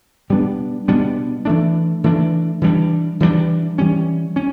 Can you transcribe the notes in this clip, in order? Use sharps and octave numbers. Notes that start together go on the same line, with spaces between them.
B2 G3 B3 D4
B2 G3 B3 D4
E3 A3 D4
E3 A3 D4
E3 G3 B3 D4
E3 G3 B3 D4
E3 G3 C#4
C#4